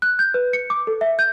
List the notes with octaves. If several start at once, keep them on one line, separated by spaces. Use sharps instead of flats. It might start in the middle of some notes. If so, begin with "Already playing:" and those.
F#6
G6
B4
C#7
D6
A4
E5
G6